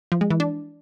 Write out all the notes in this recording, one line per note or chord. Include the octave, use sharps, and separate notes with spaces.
F3
G#3
E3
D4